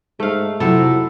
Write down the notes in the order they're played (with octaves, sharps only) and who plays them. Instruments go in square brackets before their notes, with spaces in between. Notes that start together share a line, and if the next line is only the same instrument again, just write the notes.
[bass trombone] G#2 [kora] A3 F5
[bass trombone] F2 [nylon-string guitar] C3 F#3 [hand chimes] E4 F#5 B5 [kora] A4